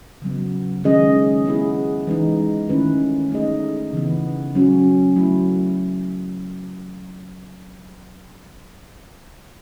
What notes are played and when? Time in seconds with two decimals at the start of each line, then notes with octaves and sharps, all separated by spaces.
0.22 C#3 F#3 B3
0.84 D#3 G#3 C#4 G#4 D#5
1.46 B3 E4 G#4
2.07 E3 G#3 D#4
2.69 D#3 A3 C#4 E4 B4
3.31 A3 D#4 G#4 D#5
3.93 C#3 E3 B3
4.55 F#3 C#4 F#4
5.16 F#3 A3 E4